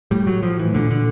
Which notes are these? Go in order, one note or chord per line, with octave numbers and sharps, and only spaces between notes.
A2 G3
F#3
F3
E3
A#2 D3
D3